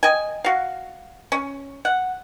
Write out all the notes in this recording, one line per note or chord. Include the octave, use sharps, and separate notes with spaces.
D#5 G5 G#5
F#4 F5
C#4
F#5